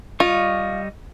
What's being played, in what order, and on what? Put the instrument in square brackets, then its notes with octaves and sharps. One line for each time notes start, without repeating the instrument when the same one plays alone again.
[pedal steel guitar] G3 D#5 C#6 [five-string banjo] F4